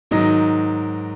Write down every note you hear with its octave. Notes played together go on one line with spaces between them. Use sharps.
G#2 D#3 F#3 D#4 D#5